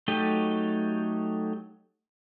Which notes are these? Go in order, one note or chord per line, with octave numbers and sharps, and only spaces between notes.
F#3 A3 D#4 G4 G5